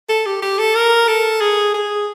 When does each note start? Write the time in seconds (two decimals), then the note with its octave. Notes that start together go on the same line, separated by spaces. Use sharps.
0.09 A4
0.26 G4
0.42 G4
0.59 A4
0.75 A#4
1.08 A4
1.41 G#4
1.74 G#4